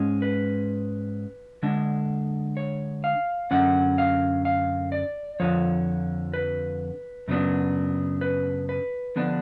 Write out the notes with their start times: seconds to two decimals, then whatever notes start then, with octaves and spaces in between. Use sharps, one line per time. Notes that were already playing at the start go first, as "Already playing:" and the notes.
Already playing: G#2 G#3 C#4
0.22 B4
1.63 D3 G#3 D4
2.57 C#5
3.04 F5
3.51 F#2 D3 F#3 C#4 F#5
3.98 F5
4.45 F5
4.92 D5
5.40 F2 D3 F3 C#5
6.34 B4
7.28 F#2 C#3 F#3 B3 D4
8.21 B4
8.69 B4
9.16 D3 F3 B3 D4